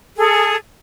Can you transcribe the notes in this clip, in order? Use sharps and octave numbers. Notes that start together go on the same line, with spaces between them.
G#4 A4